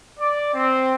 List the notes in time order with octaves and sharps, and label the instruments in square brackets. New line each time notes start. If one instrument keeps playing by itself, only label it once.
[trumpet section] D5
C4